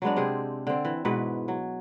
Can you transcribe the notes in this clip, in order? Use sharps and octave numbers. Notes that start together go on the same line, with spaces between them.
F#3 G#3 B3 D4
C3 C4 G#4
D3 C4
E3
G#2 B2 E3 B4
F#3